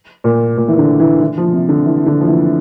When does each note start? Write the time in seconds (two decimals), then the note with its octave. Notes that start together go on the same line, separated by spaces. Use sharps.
0.24 A#2
0.57 A#2
0.68 E3
0.78 D3
1.00 E3
1.21 E3
1.38 F3
1.53 C3
1.69 D3
1.86 E3
2.06 D3
2.21 F3
2.27 E3